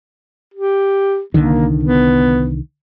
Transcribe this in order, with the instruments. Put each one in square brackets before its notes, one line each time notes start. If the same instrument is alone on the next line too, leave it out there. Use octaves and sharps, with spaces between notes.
[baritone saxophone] G4
[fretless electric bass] C2 D3 D#3 [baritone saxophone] A#3
[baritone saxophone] B3